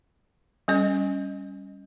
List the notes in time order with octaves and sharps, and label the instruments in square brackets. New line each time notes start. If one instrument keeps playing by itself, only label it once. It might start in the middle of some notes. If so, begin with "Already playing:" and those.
[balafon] G3 C#4 D#5